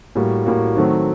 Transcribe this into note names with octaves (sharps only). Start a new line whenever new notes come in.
A2 G3 A#3 F#4
A2 G3 A#3 F#4
D#3 F#3 A3 C4 F#4